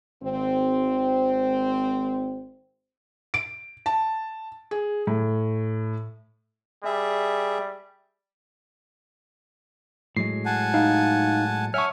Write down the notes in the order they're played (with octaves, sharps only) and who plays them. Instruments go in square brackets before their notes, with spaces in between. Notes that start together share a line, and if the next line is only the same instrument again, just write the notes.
[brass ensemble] G#1 C4
[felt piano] D7
A5
G#4
A2
[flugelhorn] G3 [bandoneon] G#4 E5
[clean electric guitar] A2 F#3 G#3 [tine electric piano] C7
[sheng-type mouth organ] F#5 G#5 A5
[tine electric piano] D#4 F5
[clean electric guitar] C#5 F#5 A5 [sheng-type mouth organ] E5 G#5 [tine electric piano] C#6 F6